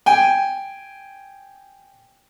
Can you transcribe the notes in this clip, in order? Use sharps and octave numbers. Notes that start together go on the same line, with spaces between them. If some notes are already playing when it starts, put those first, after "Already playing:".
G5 G#5